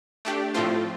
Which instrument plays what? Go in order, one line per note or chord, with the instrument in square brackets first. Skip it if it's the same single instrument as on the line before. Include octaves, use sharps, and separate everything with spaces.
[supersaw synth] A3 D4 G4
A2 F3 A3 C4 F4